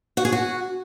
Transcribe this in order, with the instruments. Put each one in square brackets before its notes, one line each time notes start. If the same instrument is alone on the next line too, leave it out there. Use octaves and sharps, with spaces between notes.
[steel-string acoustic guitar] F#4
G#4
F#4